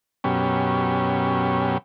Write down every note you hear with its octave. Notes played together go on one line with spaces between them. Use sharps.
F#2 B2 C#4 G4